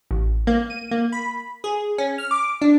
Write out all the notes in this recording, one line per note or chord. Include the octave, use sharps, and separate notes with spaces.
A1
A#3
D#7
A#3
B5
G#4
C#4
F6
D6
D4